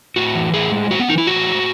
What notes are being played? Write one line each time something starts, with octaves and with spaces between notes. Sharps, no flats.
A2 F#4
E3
A2 G#4
G#3
A2 F#4
B3
E3 D#4
E4
A2 F#4
G#3